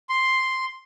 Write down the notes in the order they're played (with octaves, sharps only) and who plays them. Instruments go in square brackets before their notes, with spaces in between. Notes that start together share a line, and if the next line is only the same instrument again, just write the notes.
[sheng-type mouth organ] C6